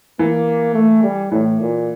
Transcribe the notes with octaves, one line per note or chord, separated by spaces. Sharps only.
E3 A#3
A3
G3
A2 E3
A#2